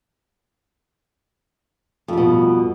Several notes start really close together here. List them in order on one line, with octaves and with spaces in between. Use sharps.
F2 G3 B2